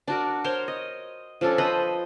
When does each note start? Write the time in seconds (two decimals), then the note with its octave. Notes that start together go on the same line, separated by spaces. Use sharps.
0.08 D4 F#4 A#4
0.44 A#4 C5 C#5 C6
0.68 D#5
1.41 F3 C#4 D4 A4
1.58 B4 C5 D#5 B5